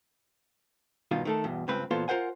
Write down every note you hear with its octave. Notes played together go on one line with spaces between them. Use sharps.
G2 B2 D#3 F4
D#3 A3 A4
E2 G2 B2
C#2 G2 C4 B4
A#2 E3 B3 F4 A4 C5
F4 A#4 C5 F#5 G#5